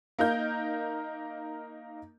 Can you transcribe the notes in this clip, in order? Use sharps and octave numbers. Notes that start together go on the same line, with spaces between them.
A#3 D#4 A#4 G6